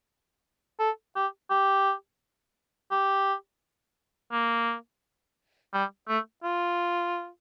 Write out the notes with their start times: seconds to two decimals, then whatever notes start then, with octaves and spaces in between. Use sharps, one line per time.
0.80 A4
1.16 G4
1.50 G4
2.91 G4
4.32 A#3
5.73 G3
6.08 A3
6.44 F4